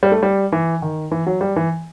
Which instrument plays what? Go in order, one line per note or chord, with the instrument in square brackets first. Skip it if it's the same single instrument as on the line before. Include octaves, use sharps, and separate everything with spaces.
[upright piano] G3
A3
G3
E3
D#3
E3
F#3
G3
E3